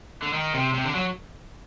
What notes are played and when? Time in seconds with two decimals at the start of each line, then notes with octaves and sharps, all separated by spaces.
0.23 D3
0.34 D#3
0.54 C3
0.74 C3
0.85 D3
0.95 F#3